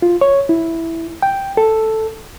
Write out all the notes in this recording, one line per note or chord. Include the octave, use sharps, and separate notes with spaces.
F4
C#5
E4
G5
A4